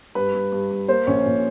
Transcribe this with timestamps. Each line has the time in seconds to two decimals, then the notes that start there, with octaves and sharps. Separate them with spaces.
0.15 G2 B4
0.34 G2
0.52 G2
0.71 G2
0.88 A#3 C5
1.07 A#1 C#4 C#5
1.26 A#2